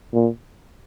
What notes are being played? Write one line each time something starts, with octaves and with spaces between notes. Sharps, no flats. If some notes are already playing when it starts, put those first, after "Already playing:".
A#2